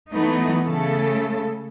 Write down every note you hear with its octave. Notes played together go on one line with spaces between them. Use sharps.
E3 F#3 A3 B3 D#4
C#3 A3 A4